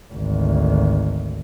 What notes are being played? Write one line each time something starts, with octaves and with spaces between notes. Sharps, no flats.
G#1 D2